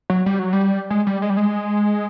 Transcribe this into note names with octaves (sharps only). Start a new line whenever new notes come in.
F#3
G3
F#3
G3
G#3
G3
G#3
G3
G#3